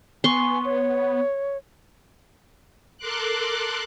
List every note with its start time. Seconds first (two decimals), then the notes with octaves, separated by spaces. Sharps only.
0.24 B3 G#5 C6 C#6
0.65 C#5
2.98 A4 A#4 C6 D6 F#6